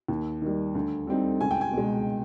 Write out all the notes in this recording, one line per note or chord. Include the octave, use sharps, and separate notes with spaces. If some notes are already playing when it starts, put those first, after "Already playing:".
D#2
D#3 G3
D2
D3 G3 C4 D#4
C#2 G#5
G5
G#5
B2 G#3